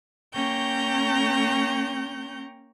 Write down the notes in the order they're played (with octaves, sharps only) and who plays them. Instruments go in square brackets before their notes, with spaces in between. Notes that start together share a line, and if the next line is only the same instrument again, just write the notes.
[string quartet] A#3 C#4 G5 A#5 C#6 G6